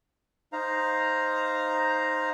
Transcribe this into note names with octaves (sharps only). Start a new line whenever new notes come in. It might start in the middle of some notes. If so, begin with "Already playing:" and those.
D#4 C5 F5 A#5